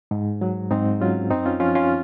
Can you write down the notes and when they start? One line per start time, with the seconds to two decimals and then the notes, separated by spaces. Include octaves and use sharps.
0.11 G#2
0.41 F#3
0.71 G#2 C4 D#4
1.01 F#3 C#4 F4
1.30 F#2 C4 D#4
1.46 C#4 F4
1.60 F3 C#4 F4
1.75 C#4 F4